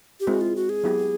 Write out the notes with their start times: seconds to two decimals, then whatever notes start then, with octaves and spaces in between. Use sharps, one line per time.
0.20 G4
0.27 G#3 C4 E4 F#4
0.41 F4
0.56 F#4
0.69 G#4
0.84 F#3 B3 E4 G4